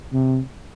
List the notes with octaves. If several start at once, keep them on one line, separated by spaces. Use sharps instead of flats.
C3